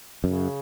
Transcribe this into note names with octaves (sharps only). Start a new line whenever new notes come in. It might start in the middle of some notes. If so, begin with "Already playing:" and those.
F#2 C#3